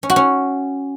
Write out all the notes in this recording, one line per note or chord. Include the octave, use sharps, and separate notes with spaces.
C#4
F#4
C#4